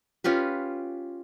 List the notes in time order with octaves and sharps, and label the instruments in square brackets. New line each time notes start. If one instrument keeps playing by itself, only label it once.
[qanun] C#4 F4 G4 B4